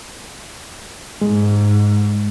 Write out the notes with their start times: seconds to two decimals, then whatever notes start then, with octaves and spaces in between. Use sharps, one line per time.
1.21 G#2 G#3